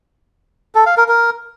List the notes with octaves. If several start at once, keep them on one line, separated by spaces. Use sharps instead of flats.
A4
F5
A#4
A#4